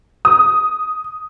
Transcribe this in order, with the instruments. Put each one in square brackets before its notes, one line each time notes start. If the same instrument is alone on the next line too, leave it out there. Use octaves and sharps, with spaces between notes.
[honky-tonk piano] D#6